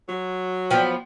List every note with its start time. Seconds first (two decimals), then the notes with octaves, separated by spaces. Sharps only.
0.09 F#3 F#4
0.71 F3 B3 G5